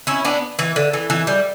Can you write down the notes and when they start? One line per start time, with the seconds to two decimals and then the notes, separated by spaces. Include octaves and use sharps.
0.07 C#4 E4
0.25 B3 D4
0.59 E3
0.76 D3
0.93 E3
1.10 E3
1.27 G3